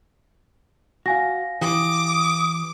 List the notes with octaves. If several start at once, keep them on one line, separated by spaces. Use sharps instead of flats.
F#4 F5 G#5 A#6
E3 G4 D6 D#6